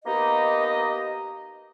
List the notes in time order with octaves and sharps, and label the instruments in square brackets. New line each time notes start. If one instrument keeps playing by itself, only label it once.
[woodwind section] A#3 B3 D#4 G4 D#5